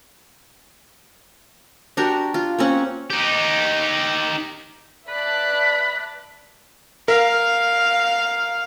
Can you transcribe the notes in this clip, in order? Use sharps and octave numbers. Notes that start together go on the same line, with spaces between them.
D4 F#4 G4 A#4
F4
A#3 C4 C#4 F#5
D#4 G4
B4 D5 E5 A5 B5 F#6
A#4 F5